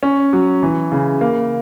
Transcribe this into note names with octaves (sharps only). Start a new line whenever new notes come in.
C#4
F#3
E3
C#3
A#3